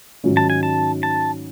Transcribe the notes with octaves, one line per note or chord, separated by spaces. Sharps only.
G#2 D#3 F#3 C#4
A5
G#5
A5
A5